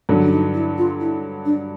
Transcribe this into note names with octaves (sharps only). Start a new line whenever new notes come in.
G2 D3 F#3
D4
D#4
E4
F4
E4
D4